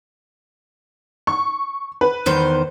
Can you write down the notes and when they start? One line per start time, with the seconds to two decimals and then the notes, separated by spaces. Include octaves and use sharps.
1.27 C#6
2.01 B4
2.26 E2 D#3 C5